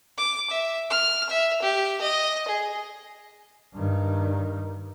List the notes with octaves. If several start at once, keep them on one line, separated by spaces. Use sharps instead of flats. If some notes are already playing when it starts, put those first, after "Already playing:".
D6
E5
F6
E5
G4
D#5
G#4
G2 D#3